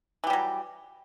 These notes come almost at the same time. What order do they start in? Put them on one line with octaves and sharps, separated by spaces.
E3 G4 G3 F#3